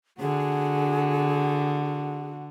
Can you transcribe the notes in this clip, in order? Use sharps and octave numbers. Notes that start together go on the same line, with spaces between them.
D3 F#4 G#4